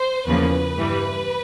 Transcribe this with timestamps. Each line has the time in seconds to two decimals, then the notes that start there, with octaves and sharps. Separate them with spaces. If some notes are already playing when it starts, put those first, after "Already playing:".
Already playing: C5
0.26 E2 C#3 F3 A#3 B4
0.76 G2 E3 G3